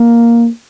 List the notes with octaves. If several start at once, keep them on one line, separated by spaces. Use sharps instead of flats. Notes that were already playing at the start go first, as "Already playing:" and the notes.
Already playing: A#3